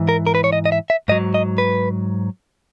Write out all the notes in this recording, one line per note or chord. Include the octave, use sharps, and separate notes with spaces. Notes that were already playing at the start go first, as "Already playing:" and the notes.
Already playing: G#2 E3
A#4
A#4
B4
C#5
D#5
D#5
E5
E5
G#2 F#3 D#5
D#5
B4